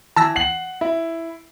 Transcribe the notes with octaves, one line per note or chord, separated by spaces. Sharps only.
E3 A5 E6 A#6
F#5 C7 F#7
E4